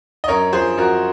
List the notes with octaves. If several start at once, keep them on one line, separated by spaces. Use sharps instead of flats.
D#5
F#2 A#4 C#5
F3 G#4 C5
F#2 F#4 A#4